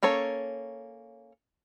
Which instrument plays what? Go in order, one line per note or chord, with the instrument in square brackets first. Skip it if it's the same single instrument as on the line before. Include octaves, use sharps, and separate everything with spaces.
[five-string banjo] A#3 C#4 A4 C#5